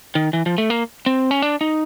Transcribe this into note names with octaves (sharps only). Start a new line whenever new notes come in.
D#3
E3
F3
A3
A#3
C4
C#4
D4
D#4